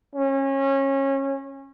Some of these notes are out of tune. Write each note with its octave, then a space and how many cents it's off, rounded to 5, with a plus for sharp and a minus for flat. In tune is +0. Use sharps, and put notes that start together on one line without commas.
C#4 -25